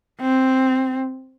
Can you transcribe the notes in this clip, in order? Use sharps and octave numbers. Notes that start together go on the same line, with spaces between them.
C4